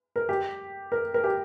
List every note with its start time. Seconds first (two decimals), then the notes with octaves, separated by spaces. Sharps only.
0.16 A#4
0.29 G4
0.92 A#4
1.14 A#4
1.24 G4